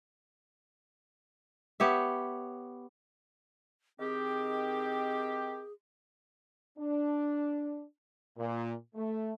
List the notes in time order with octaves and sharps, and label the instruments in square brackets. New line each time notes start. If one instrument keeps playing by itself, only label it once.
[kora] B3 G4 C#5 E5
[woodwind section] D#3 C4 G4 [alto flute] G#4
[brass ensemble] D4
A#2
A3